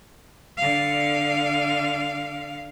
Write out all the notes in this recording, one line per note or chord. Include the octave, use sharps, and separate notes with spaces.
D3 F5